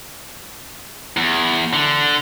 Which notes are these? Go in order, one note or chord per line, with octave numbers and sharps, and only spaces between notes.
E2
D3